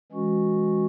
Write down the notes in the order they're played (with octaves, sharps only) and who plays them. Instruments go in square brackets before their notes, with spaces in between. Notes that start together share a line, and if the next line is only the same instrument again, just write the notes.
[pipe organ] E3 G#3 C#4 F#4